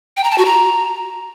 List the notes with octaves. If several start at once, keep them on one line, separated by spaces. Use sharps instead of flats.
G5
A#5
A5
F#4
A#5